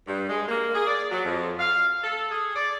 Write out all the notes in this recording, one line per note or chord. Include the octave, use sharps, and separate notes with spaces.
G2
G#3
A#3
G#4
D5
F#3
F2
F5
A4
G#4
D5